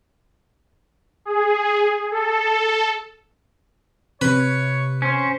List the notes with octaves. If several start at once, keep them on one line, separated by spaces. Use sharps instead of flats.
G#4
A4
C3 B4 C#5
C#4 C5